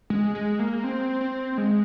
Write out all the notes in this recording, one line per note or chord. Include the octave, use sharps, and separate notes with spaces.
G#3
G#3
A#3
C4
C4
G#3